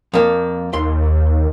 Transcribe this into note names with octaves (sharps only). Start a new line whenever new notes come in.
F2 A#3
D#2 C6